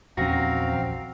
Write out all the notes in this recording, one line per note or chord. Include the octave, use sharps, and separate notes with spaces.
A#1 E2 C4 C#4 F#4 F5 A#5